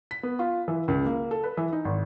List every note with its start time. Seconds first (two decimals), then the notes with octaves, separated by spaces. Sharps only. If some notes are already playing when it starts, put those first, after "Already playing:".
0.11 B6
0.23 B3
0.39 F4
0.68 E3
0.88 C#2
1.06 A#3
1.31 A4
1.44 B4
1.57 E3
1.73 D#4
1.85 G#1